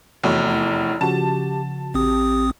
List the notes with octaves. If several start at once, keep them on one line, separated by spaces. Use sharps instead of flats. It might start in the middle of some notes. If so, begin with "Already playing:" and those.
F1 E2 A3 F#4 C#5
E4
C#3 F3 F#4 G4 A5
A1 C4 G4 D#6